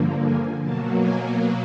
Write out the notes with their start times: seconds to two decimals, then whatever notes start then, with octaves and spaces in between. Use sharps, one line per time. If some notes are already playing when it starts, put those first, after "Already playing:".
Already playing: G2 D3 F3 A#3
0.24 G#5
0.62 B2 F#3 A#3 A5
0.99 G#5